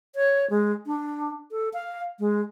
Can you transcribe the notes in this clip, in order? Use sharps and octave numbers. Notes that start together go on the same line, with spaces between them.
C#5
G#3
D4
A4
F5
G#3